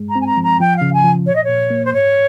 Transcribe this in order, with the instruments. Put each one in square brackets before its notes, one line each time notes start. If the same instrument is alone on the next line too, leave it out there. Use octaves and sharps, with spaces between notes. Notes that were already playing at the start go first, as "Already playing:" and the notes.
Already playing: [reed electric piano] G2 G#3
[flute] A#5
[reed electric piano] C4
[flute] G#5
A#5
[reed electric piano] F3
[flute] A#5
[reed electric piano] F3 [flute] G5
[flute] F5
[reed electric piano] C#3
[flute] G#5
[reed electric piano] F3
[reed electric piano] A#2 [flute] C#5
[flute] D#5
[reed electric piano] A#2 [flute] C#5
[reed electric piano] A#3
[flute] C5
[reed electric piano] G#2 [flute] C#5